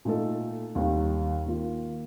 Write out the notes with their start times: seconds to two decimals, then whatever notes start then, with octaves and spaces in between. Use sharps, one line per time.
0.05 A#2 A3 D#4 A4
0.75 D#2 D#3 G3
1.46 D#3 A#3 F4